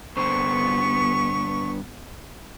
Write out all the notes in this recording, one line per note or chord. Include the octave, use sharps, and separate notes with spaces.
G2 D3 B3 C5 C#6